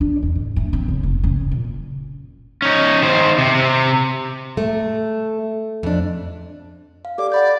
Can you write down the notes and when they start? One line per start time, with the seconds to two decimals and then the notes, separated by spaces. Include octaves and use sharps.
0.01 D4
0.23 E2
0.35 G#2
0.56 A3
0.73 C4
0.88 C#3
1.03 F1
1.23 C#3
1.52 A#2
2.62 C#4 D#4
3.02 D#3 C5
3.38 C3
3.55 C3
4.57 A3
5.83 F2 D4
7.05 F5
7.18 G4 A4 D5 D6
7.32 D5 F#5 B5 G6